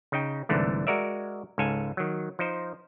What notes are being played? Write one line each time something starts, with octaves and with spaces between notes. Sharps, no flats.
C#3 D#4 G5
C2 G#2 D3 E3 A3
G#3 F#4 A#4 D5 E5
C#2 G#2 A4 F5 G#5
D#3 F#3
F3 D#4 C5